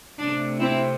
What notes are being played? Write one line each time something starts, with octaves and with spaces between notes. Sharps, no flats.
C3 A3 D4
C4 E4